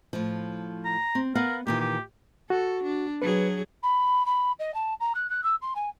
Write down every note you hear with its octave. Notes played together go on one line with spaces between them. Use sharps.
A2 F3
A#5
C4
B3 A#4 F5 F#5
A#2 D#3 E3 G4
G4
F#4 A4
D4
F#3 G#4 B4
B5
B5
D#5
A5
A#5
F#6
F#6
E6
C6
G#5